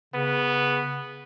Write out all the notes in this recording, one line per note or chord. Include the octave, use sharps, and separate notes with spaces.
C#3 B3